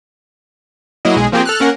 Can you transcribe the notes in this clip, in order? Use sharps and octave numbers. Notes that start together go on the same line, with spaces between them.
F#3 A#3 E4 D#5
B1 G#3 G#4
F3 A#3 C4 G4 G#4
A4 F6 F#6
A#3 C#4 A#4 F#5